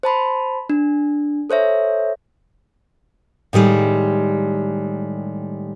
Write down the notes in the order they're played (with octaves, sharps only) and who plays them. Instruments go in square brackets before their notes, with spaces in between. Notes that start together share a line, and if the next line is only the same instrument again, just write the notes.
[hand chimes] C5 A5 B5 C6
D4
A4 C5 C#5 E5
[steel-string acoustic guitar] A2 D#3 G3 G#3